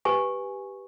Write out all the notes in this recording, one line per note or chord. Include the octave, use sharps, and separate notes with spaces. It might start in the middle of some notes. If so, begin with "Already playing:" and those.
G4 B4 G#5 C#6